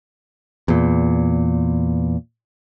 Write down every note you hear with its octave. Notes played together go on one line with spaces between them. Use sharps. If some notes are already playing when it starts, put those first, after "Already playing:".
E2 A#2